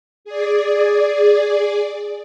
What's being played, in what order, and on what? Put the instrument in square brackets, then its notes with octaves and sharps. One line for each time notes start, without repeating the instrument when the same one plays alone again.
[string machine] G#4 D5